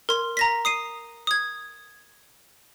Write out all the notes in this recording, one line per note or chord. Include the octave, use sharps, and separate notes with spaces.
A#4 C6
A#5 A#6 B6
D#6 C7 D#7
D#6 G#6